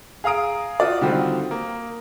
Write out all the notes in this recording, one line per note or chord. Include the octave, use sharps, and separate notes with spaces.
G#4 F5 A#5 D#6 D7
F4 F#4 D5
D3 D#3 G3 C4 F4 F#4
A#3